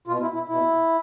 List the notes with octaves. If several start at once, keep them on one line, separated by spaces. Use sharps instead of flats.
B2 F4
E4
E4
B2 E4